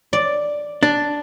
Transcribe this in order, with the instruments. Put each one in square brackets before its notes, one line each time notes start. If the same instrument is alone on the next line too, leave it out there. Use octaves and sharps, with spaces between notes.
[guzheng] D5
[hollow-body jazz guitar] D4